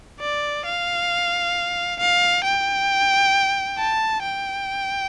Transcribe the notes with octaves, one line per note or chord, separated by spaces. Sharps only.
D5
F5
F5
G5
A5
G5